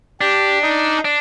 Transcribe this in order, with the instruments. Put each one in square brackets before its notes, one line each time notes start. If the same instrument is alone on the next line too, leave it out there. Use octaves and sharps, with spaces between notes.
[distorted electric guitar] D4 [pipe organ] G4
[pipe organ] D#4
[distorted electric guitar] D4